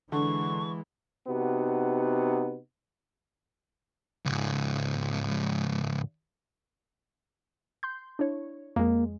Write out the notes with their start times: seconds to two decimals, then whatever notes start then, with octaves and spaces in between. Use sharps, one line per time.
0.12 D3 E3 G#3 C#6
1.28 C3 B3 D#4 F#4
4.26 C#2 G#2
7.83 C6 G6
8.19 D4 E4 C#5
8.76 F2 G#3 A#3